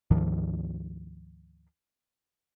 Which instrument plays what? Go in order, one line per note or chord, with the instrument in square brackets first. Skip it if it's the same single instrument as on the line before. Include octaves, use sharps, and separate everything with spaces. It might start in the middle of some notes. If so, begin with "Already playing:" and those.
[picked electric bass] D2 G#2 D#3 F3